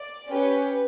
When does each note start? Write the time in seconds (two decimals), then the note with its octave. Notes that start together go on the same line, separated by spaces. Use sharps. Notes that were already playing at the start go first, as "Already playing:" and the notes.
Already playing: D5
0.30 C#4 G4 B4